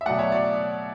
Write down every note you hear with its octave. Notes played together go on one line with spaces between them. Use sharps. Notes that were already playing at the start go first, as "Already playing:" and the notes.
E5
B2 F#3 A3 D5 F#5
C#5 E5
D5